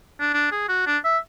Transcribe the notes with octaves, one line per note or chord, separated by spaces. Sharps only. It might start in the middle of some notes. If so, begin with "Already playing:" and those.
D4
D4
G#4
F#4
D4
E5